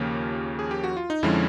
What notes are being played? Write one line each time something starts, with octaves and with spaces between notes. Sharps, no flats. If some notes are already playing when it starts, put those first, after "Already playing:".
Already playing: D#2 C#3 F3 A#3 C#4 G4
G#4
G4
F#4
F4
D#4
F2 D3 F3 G#3 C#4 E4